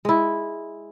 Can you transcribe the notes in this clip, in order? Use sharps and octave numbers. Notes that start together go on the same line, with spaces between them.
G#3 E4